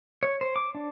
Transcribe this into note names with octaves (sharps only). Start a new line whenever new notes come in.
C#5
C5
D6
D4